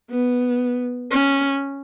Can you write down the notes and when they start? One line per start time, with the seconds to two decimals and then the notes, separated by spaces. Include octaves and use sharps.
0.10 B3
1.11 C#4